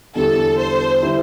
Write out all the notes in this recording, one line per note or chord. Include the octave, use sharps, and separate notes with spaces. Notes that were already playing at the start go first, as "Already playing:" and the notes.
E2 D3 G3 E4 G4 A4
C5
D3 G3 E4 G4